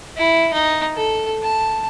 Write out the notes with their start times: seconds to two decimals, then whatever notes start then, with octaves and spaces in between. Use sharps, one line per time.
0.17 E4
0.53 D#4
0.96 A4
1.42 A5